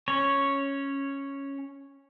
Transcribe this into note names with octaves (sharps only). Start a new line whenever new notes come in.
C#4 C#5